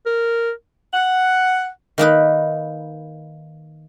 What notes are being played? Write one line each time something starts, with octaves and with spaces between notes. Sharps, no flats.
A#4
F#5
D#3 A#3 D#4 B4